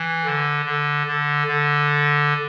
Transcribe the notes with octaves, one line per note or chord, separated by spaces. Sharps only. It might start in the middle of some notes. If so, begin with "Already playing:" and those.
Already playing: E3
D3
D3
D3
D3